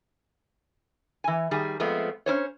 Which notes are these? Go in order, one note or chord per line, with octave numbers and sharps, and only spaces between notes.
E3 G#5
D#3 G3 G#4
F3 G#3 A3 B3 C4
C#4 E4 C5 C#5